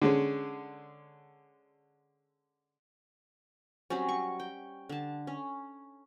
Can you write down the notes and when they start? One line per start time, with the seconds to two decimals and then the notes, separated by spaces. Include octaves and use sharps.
0.02 D3 G#3 C#4
3.90 F#3 G3 C4 C#4
4.09 C#6
4.40 G5
4.89 D3 A5
5.27 C#4